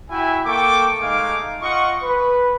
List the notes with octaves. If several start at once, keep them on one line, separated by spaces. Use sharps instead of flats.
E4 F#4 E5 G5 G#5
A#3 A4 G5 C#6 D6
G#3 A3 D#4 F5 G#5 D6
F4 D#5 F#5 C#6
B4